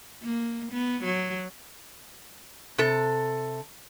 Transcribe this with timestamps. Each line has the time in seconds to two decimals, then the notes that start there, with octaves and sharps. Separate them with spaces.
0.23 A#3
0.72 B3
1.04 F#3
2.78 C3 A4